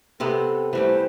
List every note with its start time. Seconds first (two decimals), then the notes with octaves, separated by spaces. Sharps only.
0.20 C3 B3 C4 A4
0.73 E3 G3 A3 C5